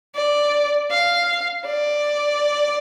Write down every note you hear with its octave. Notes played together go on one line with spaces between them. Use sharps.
D5
F5
D5